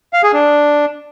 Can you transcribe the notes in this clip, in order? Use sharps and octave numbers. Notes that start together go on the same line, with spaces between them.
F5
G#4
D4